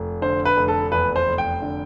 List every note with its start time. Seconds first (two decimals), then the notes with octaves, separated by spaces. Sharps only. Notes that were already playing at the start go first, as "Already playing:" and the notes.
Already playing: F1
0.22 D3 C5
0.45 B4
0.57 F1
0.68 A4
0.92 E2 B4
1.16 C5
1.27 F1
1.38 G5
1.62 D3